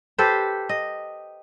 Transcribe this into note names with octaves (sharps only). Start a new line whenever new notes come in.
G4 A4 B4 C5
D#5